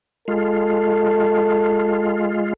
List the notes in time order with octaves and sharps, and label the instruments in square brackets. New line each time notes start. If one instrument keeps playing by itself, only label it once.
[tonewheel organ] G#3 F4 [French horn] A4